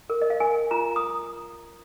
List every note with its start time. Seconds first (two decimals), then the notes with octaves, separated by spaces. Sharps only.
0.10 A#4
0.22 D#5
0.30 F5
0.40 A#4 G#5
0.71 F4 A#5
0.96 D#6